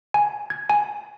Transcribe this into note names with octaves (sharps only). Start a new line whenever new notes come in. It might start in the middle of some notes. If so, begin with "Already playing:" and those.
G#5
G#6
G#5